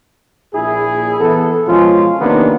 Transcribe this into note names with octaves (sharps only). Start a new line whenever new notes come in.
A#1 A#2 E4 G#4
E3 B3 A4
B2 F3 G#3 C#4 F4
C3 D#3 A#3 B3 C#4 D4